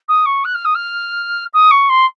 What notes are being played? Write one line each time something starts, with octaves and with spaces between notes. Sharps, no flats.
D#6
C#6
F#6
F6
D#6
F6
D#6
C#6
C6